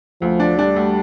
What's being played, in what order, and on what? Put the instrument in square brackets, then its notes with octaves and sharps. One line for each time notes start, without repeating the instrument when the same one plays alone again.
[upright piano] D2 [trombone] F3
[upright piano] D4
[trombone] G3 [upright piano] D4
[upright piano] D2